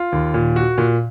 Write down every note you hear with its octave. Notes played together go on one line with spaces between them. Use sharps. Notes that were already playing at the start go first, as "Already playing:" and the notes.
Already playing: F4
D#2
A#2
F#4
A#2